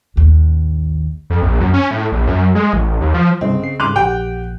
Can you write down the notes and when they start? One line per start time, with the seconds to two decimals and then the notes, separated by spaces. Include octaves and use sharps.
0.16 A1 D#2
1.30 F2
1.42 A#1
1.61 F#2
1.74 C#4
1.91 A2
2.12 A#1
2.28 F#2
2.55 G#3
2.73 A1
3.01 D#2
3.14 F3
3.41 C2 G2 C#3 C4 D#5
3.60 C#3 C7
3.80 G#2 C#3 G3 C6 D6 F#6 D#7 F7
3.96 A#1 G4 F#5 G5